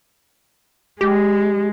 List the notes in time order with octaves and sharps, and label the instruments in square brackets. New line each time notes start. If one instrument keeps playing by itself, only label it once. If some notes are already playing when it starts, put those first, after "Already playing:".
[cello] G#3 [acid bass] G4